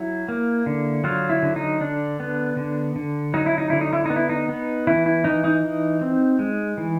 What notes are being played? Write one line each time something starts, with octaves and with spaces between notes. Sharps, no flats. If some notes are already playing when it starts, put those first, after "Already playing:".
Already playing: F#3 E4
A#3
D3
F#3 F4
E4
D3
D#4
D3 D4
B3
D3
D3
F#3 D#4
E4
D#4
D3 E4
D#4
E4
B3 D#4
E4
D#4
B3
E3 E4
E4
E3 D#4
D#4
E3
C4
G#3
E3